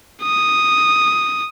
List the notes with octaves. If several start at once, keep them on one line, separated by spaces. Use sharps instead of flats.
D#6